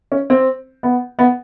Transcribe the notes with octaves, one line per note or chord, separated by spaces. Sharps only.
C#4
C4
B3
B3